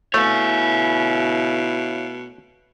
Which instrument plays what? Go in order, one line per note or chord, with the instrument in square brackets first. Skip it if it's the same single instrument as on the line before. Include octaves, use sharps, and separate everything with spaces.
[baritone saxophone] B2 [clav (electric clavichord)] A3 [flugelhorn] E4 [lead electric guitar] C#5 F5